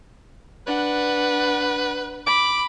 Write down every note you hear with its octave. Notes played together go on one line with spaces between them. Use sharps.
D4 B4 F#5
B5 D6